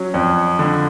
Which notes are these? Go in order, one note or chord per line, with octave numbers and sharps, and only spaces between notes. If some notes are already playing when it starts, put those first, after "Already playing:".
Already playing: F#3 C#4
F2
D3